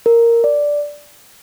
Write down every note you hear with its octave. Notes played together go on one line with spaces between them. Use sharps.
A#4
D5